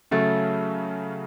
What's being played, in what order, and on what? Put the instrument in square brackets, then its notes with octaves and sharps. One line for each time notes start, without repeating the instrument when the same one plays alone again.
[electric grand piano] C#3 F#3 C#4 [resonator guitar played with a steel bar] A3